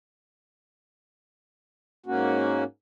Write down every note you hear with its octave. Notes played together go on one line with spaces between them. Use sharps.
G#2 A#3 C#4 F#4